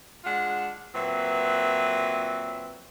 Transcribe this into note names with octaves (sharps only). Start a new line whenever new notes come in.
G#3 D4 F4 F#5
A#2 F#3 C4 B4 E5